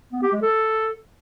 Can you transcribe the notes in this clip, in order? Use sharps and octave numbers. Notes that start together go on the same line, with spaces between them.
B3
G4
G#3
A4